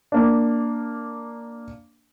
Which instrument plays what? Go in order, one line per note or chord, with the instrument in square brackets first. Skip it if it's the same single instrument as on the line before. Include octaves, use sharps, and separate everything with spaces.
[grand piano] A#3 D4